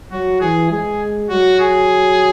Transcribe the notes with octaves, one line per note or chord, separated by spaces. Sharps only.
F#3 F#4
E3 G#4
G#3 G#4
F#3 F#4
G#4